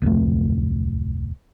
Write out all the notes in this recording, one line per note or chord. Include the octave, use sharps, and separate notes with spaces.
D1 C2 F2 A3